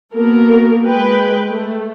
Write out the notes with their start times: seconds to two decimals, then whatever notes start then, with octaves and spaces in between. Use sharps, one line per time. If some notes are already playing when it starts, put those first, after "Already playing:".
0.14 A#3 B3 F#4 A4 A#4
0.86 G#3 B4 G5
1.48 A3